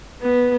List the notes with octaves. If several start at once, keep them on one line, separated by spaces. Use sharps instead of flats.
B3